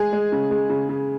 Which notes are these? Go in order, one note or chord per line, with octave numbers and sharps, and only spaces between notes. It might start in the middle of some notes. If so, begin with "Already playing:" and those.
Already playing: G#3 G#4
G#3
C#3
G#3
C#3
C#3